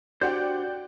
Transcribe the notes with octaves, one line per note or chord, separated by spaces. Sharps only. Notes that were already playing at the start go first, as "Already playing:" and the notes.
D4 F#4 G4 C5 D5 F#5 G5 G6